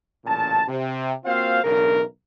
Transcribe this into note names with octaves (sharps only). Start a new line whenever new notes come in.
A1 A#2 C#3 A5
C3
A#3 C4 F4 F#4 C5 F5
B1 E2 C#3 D4 A#4